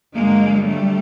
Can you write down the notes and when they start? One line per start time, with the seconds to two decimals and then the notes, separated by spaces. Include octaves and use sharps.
0.14 G2 D3 F#3 G#3 A#3
0.65 G3 A3